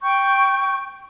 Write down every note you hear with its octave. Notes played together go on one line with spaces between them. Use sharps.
G5 C#6 G6